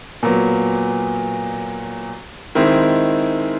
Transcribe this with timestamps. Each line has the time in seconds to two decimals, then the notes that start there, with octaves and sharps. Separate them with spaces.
0.23 A#2 F#3 B3
2.55 D#3 G#3 C4 E4